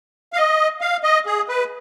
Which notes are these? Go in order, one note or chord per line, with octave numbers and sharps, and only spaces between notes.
F5
D#5
F5
D#5
G#4
B4